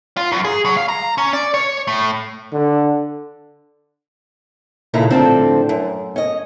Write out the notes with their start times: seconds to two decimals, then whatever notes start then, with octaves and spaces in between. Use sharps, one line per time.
0.17 F4
0.32 F#2
0.45 G#4
0.66 F#3
0.77 F5
0.89 A#5
1.18 C#4
1.33 D5
1.54 C#5
1.88 A2
2.53 D3
4.94 D#2 A#2 C#3 E4 A4 A#5
5.10 A2 D3 F3 C4 D4 A4
5.69 F#2
6.16 C#4 D#5